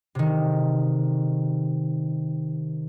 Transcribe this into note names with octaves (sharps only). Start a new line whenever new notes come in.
C3 D#3